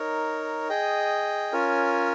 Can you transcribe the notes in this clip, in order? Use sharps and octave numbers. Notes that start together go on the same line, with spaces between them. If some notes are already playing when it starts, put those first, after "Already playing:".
Already playing: D#4 A#4 C#5
G#4 D#5 G5
C#4 F4 A#4 C#5 G#5